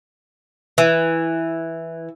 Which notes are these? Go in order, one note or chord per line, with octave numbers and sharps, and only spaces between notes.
E3